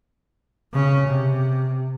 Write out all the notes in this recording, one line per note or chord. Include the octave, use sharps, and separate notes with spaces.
C#3 C#4
C3